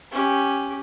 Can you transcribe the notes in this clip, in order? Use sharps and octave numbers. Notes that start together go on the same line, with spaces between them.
C#4 G4